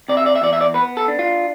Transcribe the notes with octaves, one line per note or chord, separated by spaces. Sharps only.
C3 D5
E5
D5
E5
E2 D5
E5
D5
B3 B4
A4
D4
F4